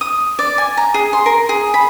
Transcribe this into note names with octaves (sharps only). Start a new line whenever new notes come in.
D#6
D5
G#5
A#5
G#4
C6
A#4
G#4
B5